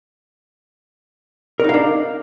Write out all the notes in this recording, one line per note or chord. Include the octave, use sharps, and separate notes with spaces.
D4 D#4 A#4 F5